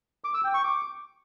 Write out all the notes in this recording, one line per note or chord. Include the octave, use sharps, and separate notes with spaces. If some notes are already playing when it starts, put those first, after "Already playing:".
D6
E6
G5
C#6
D6